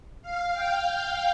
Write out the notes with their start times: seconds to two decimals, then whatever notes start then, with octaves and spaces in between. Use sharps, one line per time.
0.22 F5
0.54 G5
0.87 F5